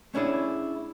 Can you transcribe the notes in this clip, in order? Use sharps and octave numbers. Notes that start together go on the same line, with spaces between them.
A3 C#4 D4 E4 G#4